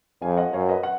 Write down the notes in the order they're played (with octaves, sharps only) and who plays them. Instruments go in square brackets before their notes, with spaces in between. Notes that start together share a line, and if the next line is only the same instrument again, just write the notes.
[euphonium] F2 [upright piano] F5 G#5
[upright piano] D#5 F#5
[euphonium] F#2 [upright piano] C#5 F5
[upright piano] B4 D#5
F#5